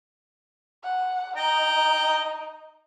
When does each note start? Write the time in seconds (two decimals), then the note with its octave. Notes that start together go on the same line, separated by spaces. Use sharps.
0.84 F#5
1.36 D#4 D#5 G5 A#5